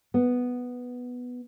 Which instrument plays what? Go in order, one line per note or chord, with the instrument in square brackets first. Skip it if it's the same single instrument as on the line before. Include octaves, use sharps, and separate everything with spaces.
[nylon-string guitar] B3